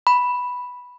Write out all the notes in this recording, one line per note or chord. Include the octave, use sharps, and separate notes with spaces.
B5